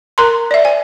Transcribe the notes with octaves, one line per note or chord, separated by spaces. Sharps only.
A#4 A#5 C6
D5 E5
C5 G#5